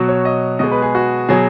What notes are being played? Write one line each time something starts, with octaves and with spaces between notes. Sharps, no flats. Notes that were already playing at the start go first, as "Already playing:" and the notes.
Already playing: B2 F#3 F#4
C#5
D#5
B2 G#3 D#5
B4
G#4
F#4
B2 F#3 G#4